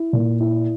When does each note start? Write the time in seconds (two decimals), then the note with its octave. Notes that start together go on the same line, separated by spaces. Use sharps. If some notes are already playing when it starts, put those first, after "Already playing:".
Already playing: E4
0.13 A#2
0.40 E4